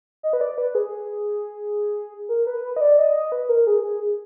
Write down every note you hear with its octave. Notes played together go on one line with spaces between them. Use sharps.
D#5
B4
D5
B4
G#4
A#4
B4
B4
D#5
D5
D#5
D#5
B4
A#4
G#4
G#4